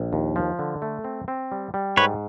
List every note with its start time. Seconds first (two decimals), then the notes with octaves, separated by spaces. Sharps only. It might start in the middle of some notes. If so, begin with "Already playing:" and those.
Already playing: A#1
0.13 D#2
0.36 F3
0.59 D3
0.82 A3
1.04 C4
1.28 C4
1.52 G3
1.74 G3
1.97 G#2 B4 C#5